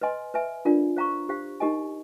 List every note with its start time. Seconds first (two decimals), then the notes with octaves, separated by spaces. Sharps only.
0.01 B4 D#5 G#5 C6
0.34 B4 E5 G#5
0.65 D4 F4 A#4 D5
0.96 C5 F5 A#5 C#6
1.29 G4 C5 F5
1.60 D#4 G4 A#4 D#5 G#5